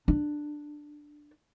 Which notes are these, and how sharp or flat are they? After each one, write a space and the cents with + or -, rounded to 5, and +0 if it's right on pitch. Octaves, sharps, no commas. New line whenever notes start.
D4 +10